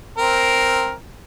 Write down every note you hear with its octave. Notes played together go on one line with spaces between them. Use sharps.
C4 A#4